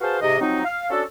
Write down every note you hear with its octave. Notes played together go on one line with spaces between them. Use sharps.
F#4 G#4 B4 C5 F5 A5
G#2 C3 D#5
F3 F#3 C4 D#4
F5
C#4 D4 F#4 A4